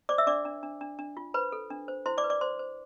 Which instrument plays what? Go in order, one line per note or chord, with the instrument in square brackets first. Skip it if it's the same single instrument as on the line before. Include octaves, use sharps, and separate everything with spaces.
[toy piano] C5 D5 D6
E5 E6
D4 D5 D6
D4
D4
D4
D4
F4
B4 C5 B5
A4
D4
C5
E4 C5 C6
D5 D6
B4
D5 D6
C5 C6
C5